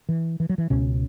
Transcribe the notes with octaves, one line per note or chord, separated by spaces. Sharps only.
E3
E3
F#3
E3
C#2 B2 C#4